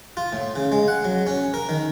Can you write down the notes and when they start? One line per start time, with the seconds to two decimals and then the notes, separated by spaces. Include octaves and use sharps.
0.17 F4
0.33 A2
0.55 C#3
0.72 G#3
0.88 F#5
1.05 F#3
1.27 C#4
1.54 A#4
1.69 D#3